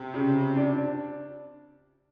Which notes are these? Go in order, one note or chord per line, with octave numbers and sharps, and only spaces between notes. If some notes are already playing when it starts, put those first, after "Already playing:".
Already playing: C3
C#3
C#3
D4
D4